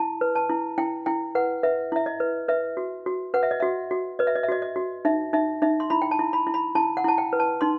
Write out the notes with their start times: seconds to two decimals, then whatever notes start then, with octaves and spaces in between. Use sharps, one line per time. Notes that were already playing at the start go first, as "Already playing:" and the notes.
Already playing: E4 A5
0.21 B4
0.35 A5
0.49 E4
0.78 E4 G5
1.06 E4 G5
1.35 B4 F#5
1.63 B4 E5
1.92 E4 E5
2.06 D#5
2.20 B4
2.48 B4 E5
2.77 F#4
3.06 F#4
3.34 B4 F#5
3.43 E5
3.51 D#5
3.60 F#4 E5
3.91 F#4
4.19 B4 D#5
4.27 E5
4.36 D#5
4.43 E5
4.49 F#4 D#5
4.62 D#5
4.76 F#4
5.05 D#4 E5
5.33 D#4 E5
5.62 D#4 E5
5.80 C6
5.90 E4 B5
6.02 G5
6.11 A5
6.19 E4
6.33 B5
6.47 E4
6.54 B5
6.75 E4 A5
6.97 F#5
7.04 E4 A5
7.18 G5
7.33 B4
7.40 A5
7.61 D#4 C6